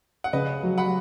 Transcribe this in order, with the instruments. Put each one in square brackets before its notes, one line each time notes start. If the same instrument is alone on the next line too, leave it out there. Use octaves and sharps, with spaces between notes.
[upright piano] F#5
[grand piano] C#3 [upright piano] B4 D#5
[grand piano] F#3
[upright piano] F#5 B5